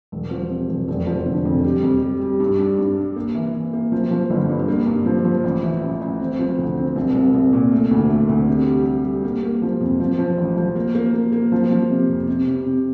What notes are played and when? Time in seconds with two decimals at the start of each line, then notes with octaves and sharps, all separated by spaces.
0.12 E1
0.31 F3
0.50 C3
0.69 E1
0.88 F1
1.07 F3
1.26 D3
1.45 F2
1.64 G3
1.83 F2
2.02 G3
2.21 G3
2.40 G2
2.59 D4
2.78 G2
2.97 G3
3.16 A#3
3.34 E3
3.54 E3
3.73 A#3
3.92 F3
4.11 F3
4.30 G1
4.49 G2
4.68 A#3
4.87 G2
5.06 F3
5.24 F3
5.44 A1
5.63 E3
5.82 A1
6.01 A1
6.20 C4
6.39 F3
6.58 D2
6.77 C4
6.96 C2
7.15 C2
7.34 C2
7.53 A#2
7.72 A3
7.91 D2
8.09 A3
8.29 D2
8.48 C3
8.67 G3
8.86 G3
9.05 G3
9.24 A#3
9.43 A#3
9.62 F3
9.81 F2
10.00 F3
10.19 F3
10.38 A1
10.57 F3
10.76 A#3
10.95 A#3
11.14 A#3
11.32 A#3
11.52 F3
11.71 F3
11.90 C3
12.09 F2
12.28 C3
12.47 C3
12.66 C3